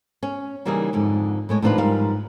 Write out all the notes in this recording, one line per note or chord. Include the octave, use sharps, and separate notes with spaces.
C#4
C#3 E3 G3 A#3 D#4 G#4
F2 G#2 D3
A2 G#3 C#5
A2 D#3 F3 D4 F4 B4
G#2 F3 G3 A#4 F5